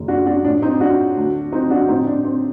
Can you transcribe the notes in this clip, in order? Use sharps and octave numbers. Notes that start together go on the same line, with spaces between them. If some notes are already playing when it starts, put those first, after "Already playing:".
Already playing: F#1 F#2 D#3
D4 F#4
D4 F#4
A#1 A2 D4
C4 D#4
D4 F#4
D2 D3
C4 D#4
D4 F#4
A#1 A2 C4 D#4
D4
C4